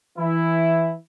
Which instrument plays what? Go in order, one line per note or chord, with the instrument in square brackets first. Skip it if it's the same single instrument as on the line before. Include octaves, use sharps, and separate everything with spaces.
[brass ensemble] E3 E4